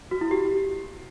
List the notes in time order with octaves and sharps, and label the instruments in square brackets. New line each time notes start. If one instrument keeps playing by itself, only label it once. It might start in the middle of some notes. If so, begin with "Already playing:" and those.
[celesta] F#4
E4
G4